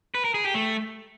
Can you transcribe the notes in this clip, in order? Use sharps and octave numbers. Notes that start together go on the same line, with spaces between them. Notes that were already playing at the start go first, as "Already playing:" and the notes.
B4
A#4
G#4
G4
A3